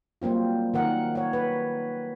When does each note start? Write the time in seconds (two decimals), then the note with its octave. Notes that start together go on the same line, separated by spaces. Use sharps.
0.22 F#3 G3 A#3 C4 F4
0.74 D#3 A#4 F#5
1.15 C#5 F#5
1.33 B4